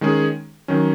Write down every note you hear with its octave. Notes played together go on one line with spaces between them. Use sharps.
D#3 G#3 C#4 G#4
D#3 F#3 C#4